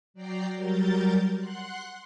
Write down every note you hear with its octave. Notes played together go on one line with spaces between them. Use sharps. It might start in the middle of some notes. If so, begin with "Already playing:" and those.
F#3 D5 G5 A#5 C7
F#3 G3 A#4 G6 A6
F#5 C6 F#6